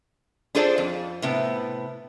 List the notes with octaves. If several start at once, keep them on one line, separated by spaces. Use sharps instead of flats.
D4 F4 G#4 A4 C5 D5
F2
A2 C3 B3